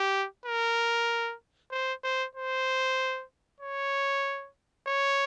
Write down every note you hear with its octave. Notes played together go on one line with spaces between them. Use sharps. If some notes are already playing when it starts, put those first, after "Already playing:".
Already playing: G4
A#4
C5
C5
C5
C#5
C#5